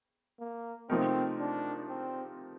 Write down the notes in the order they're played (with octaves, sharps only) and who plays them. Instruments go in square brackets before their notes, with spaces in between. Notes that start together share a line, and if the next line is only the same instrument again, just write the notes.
[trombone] A#3
[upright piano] C3 F3 A3 D#4 A#4 [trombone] C4
[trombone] D4
C4